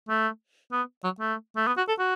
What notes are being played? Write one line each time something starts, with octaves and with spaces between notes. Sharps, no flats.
A3
B3
F#3
A3
A3
B3
F#4
A4
F#4